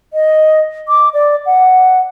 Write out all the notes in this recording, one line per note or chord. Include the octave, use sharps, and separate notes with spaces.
D#5
D6
D5
F#5